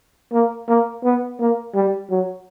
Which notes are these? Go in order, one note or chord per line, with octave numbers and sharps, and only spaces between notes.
A#3
A#3
B3
A#3
G3
F#3